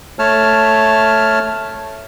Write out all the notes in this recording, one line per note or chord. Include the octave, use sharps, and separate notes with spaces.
A3 C#5 A5 F6